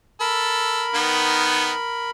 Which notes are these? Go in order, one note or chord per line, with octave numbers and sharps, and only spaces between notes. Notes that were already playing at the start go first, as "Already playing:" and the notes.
A4 A#4 B5
D#3 B3